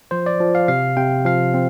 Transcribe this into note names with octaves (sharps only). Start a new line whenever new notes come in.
F3 C5
D5
F3
F5
C3 F5
C3 G5
F3 F5
C4